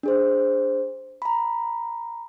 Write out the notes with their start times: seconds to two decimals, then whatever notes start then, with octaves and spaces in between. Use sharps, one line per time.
0.03 D4 G#4 C5
1.22 A#5 B5